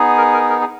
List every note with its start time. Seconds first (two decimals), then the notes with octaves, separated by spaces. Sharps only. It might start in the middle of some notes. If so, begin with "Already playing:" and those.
Already playing: B3 D#4 G#4
0.18 A#4
0.34 A#4
0.49 A#4
0.61 G#4